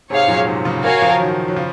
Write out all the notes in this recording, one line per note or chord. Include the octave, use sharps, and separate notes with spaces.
G#2 C3 G#4 C#5 F5
F#2 A#2
G#2 C3
A#2 C#3
F#4 A#4 C#5 F5 G#5
C#3 F3
D#3 F#3
F#3
C#3 F3